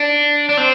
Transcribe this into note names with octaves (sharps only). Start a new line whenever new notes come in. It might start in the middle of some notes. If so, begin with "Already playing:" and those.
Already playing: D4
D4
C4